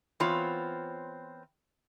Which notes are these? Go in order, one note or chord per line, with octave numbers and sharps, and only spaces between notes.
E3 B3 C4 F4 C#5